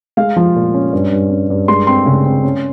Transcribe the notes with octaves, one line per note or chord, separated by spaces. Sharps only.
G#3 F5
F3
A#2
C#4
G2
G2
C#4
G2
G#3 C6
C4 C6
C#3
C4
C#4